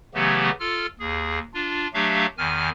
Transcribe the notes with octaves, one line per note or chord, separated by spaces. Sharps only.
C#3 E3 F#3 A3 B3 G4
F4 A4 F6
D#2 G#4
D4 F4
F#3 A3 D4 G4 E5 F5
E2 D#3 G#5 F6